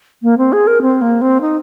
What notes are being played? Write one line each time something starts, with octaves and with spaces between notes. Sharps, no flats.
A#3
C4
G#4
A#4
C4
A#3
C4
D#4